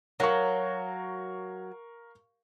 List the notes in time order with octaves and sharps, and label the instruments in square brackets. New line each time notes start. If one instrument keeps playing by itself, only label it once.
[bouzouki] F#3 [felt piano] A#4 F5 C#6